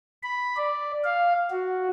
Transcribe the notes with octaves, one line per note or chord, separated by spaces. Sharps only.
B5
D5
F5
F#4